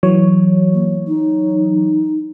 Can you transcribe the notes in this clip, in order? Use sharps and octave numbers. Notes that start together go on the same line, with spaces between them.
E3 F#3 C#5
A#3
D#4